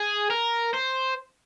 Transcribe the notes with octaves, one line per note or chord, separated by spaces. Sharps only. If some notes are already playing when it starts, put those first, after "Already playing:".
Already playing: G#4
A#4
C5